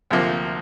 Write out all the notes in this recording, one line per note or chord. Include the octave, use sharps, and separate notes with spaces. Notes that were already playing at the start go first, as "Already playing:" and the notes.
D2 C3 F3 A#3